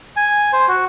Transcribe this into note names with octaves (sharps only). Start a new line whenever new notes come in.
G#5
C5
F#4